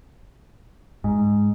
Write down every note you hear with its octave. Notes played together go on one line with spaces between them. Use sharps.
G#2